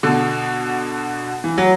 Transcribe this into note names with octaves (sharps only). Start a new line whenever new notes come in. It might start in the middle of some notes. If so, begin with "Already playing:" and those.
B2 D3
E3
F#3